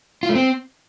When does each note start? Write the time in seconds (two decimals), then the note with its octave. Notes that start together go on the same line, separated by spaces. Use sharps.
0.23 F4
0.29 A3
0.35 C4